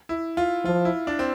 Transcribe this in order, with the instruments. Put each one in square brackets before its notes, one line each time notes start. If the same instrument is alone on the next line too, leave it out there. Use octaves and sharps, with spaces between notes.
[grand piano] E4
F4
[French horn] F3 [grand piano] F4
[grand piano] E4
D4
C4